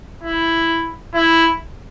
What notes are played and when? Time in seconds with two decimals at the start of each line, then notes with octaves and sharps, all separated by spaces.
0.23 E4
1.14 E4